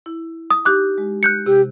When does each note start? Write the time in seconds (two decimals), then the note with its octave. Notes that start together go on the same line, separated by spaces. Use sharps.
0.06 E4
0.51 D#6
0.65 D#4 G4 D6 F#6
0.98 G#3
1.23 F#6 G6 C#7
1.46 C3 G4